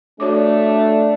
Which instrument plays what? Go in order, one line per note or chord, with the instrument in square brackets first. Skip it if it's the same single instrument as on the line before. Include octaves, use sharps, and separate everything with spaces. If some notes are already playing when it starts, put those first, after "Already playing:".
[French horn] A3 [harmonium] D4 [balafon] F#4 C#5 D6